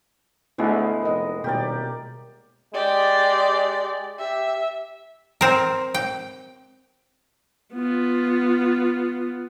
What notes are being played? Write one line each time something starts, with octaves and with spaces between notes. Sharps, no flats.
D2 G#3 B3 E4
F1 A#4 D#5
D#1 B2 G4 A#4 D5
G#3 G4 D5
G4 E5
C4 A#4
G5
B3 F4